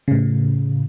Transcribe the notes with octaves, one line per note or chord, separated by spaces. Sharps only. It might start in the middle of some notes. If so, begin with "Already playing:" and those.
A2 C#3